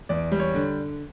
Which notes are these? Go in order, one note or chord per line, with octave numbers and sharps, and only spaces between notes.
E2 D5
G3
C#5
D3